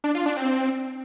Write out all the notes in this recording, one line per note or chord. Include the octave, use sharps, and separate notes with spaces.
D4
F4
D4
C4